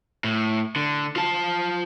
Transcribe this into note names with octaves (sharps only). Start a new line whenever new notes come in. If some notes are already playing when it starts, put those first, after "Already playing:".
A2
D3
F4 A5